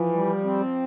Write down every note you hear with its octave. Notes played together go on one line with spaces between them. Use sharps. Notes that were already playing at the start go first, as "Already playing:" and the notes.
Already playing: E3 F3
G3
C4